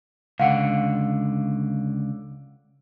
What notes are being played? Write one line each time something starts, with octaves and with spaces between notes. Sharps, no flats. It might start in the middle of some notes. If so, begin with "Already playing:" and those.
C#2 D3 F5 F#5